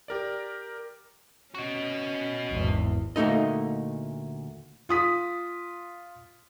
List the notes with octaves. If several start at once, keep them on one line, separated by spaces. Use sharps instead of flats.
G4 A#4 D5
C#4 F#4 D#5
G#1 E2
D2 A#2 A3 D#4 D#5
F4 D#6 B6